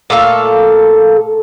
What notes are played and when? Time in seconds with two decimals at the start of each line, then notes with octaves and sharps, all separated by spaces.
0.10 A#2 A3 A4 F5